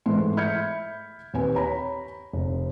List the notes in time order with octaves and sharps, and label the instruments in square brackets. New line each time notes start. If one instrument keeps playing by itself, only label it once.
[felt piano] G#2 E3 A3 C6
E5 B5 F6 G6 G#6 C#7
D#2 C4 B4 G#5
C#5 A#5 B5
F1